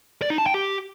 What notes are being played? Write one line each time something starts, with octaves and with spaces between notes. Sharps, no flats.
D5
D#4
A5
G5
G4